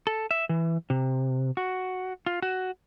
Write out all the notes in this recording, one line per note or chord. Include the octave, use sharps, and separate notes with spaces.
A4
E5
E3
C3
F#4
F4
F#4